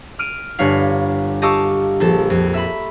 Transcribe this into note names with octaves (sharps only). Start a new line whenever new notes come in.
F6 D7 D#7
G1 G2 B4 C#5 F5
G4 D#5 F5 A5 C#6 E6
A#1 F3 A4
F2
E5 B5